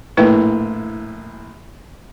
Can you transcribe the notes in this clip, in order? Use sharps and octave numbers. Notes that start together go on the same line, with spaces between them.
A#1 A2 E4 B4 G5